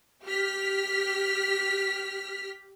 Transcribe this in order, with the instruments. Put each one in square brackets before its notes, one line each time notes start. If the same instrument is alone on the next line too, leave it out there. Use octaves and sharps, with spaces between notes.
[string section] G4 F6 B6